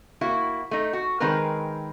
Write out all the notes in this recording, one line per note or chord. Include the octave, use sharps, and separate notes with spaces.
A#3 E4 F#4
A3 D#4
F#4
D#3 G#3 C4 A#4 B4